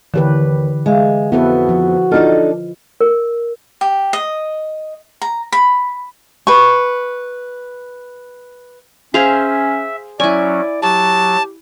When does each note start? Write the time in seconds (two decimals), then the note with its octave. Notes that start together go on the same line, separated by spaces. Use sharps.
0.14 D#2 D3 E3 G4 B4
0.86 G#3 G#4 E5 F5
1.32 F2 B3 E4 F#4 A4 B4 E5
1.69 F3
2.11 D4 D#4 F4 A4 D#5 F6
3.01 A#4
3.81 G4
4.13 D#5
5.22 A#5
5.52 B5
6.47 B4 C#6
9.14 C#4 G#4 C5 E5 F5
10.20 F#3 C#4 E4 D5 G#5
10.82 F#3 G4 A5